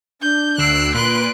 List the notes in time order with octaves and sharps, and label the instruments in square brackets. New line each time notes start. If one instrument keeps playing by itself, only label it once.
[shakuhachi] D4 [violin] G6
[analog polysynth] D2 E6 D7 [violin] F#6 C7
[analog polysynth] A#2 B4 D7 [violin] C6 F#6